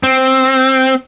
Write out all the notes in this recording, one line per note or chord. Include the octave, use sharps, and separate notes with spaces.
C4